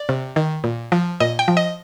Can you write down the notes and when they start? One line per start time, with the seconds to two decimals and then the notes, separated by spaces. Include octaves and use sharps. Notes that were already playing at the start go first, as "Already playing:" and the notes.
Already playing: D5
0.09 C3
0.36 D#3
0.64 A#2
0.92 F3
1.20 A#2 D#5
1.39 G5
1.48 F3
1.57 D#5